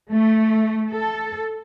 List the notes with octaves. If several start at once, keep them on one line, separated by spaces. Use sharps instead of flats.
A3
A4